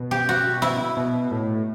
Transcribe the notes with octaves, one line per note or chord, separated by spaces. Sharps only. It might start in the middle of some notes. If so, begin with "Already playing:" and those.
Already playing: B2
G4
F#4
E4
B2
A2